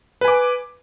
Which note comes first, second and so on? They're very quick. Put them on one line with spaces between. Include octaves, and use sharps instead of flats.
B4 G#5 D6